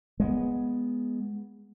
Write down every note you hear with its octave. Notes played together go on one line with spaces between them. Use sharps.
G#3 A3 B3